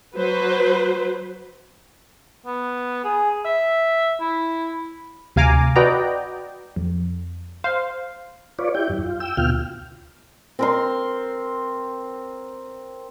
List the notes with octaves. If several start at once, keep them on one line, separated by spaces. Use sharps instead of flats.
F#3 B4 C5
B3
G#4
E5
E4
D2 C3 F5 G#5 A#5 D6
F#4 B4 D5 D#5 G5 A#5
F2
C5 F5
F4 B4 C#5 D5
E4 G4 G5
F#2
F4
G5 E6
D2 B2 F4 G5 F6
C4 A#4 C6